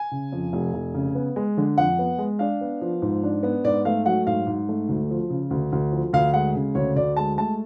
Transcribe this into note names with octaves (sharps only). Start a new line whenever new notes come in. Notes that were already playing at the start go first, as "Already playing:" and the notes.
Already playing: G#5
C#3
F2
F1
F1
C#3
B3
G#3
D3
F2 F#5
B3
G#3
D4 F5
B3
F3
G#2
D4
B3
G#2 D5
A3 F5
F#3 F#5
G#2 F5
G#2
A3
D2
F3
C#3
D2
D2
F3
D2 F5
G#3 F#5
C#3
D2 C#5
D2 D5
G#3 A5
A3 A5